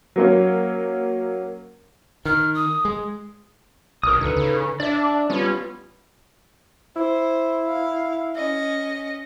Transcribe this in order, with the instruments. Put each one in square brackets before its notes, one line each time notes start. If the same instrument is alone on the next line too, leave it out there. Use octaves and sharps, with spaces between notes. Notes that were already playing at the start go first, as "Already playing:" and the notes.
[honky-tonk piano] F#3 A#3 C#4
[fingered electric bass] D#3 [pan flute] F6
[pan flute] D#6
[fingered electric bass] G#3
[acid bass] B1 [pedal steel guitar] A#4 D#6
[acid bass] D2 [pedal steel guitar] D#4 A4 B4
[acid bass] C#3
[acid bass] D4 [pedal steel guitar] D5 E5
[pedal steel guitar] G3 B3 F4 [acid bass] C#4
[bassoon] E4 [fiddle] C5
[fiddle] F5
C#4 D#5